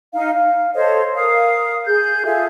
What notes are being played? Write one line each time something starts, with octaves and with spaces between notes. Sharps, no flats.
D#4 F5
F5
A4 C5 C#5 D#5
A#4 F5 D#6
G#4 G6
F4 G#4 A4 E5